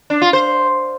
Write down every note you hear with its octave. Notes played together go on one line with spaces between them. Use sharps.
D4
F4
C5